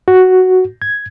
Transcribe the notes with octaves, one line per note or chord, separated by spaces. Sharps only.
F#4
G#6